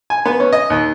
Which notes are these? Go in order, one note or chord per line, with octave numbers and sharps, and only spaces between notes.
G#5
B3
C#4
D#5
D#2